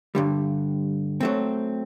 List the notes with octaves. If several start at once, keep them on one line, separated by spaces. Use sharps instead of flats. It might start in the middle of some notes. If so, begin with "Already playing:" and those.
G2 D3 G3
F#3 A3 C4